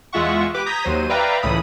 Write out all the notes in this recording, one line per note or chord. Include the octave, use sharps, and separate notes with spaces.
E2 G#3 F4 E5 F#5 C#6
G4 B4 D6
A#5 D#6 G6 G#6 A#6 B6
D#2 F#3 C5 D#7
B4 D5 E5 F5 G5 A#5
C#2 A2 E3 B5 D#6 D#7